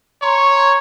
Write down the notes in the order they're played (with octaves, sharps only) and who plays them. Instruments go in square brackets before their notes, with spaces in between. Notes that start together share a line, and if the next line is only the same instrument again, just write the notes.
[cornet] C#5 [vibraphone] A#5 C6 C#6